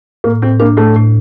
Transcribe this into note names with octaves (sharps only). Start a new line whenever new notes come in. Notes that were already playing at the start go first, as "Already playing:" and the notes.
A2 A#3
A2 C4
A#3 D4
A2 A3
A2